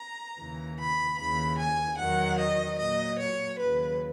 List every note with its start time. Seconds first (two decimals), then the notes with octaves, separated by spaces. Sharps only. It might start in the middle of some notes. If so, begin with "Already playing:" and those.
Already playing: A#5
0.39 D#2 C#3 E3
0.79 B5
1.19 D#2 C#3 E3 B5
1.59 G#5
1.98 E2 D#3 F#3 F#5
2.39 D#5
2.79 A#2 F#3 D#5
3.19 C#5
3.59 D#2 C#3 F#3 B4